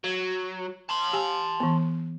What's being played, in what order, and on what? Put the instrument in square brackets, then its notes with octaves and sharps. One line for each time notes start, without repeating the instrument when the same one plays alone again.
[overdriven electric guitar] F#3
A5 C6
[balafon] G4 G#5
E3 B3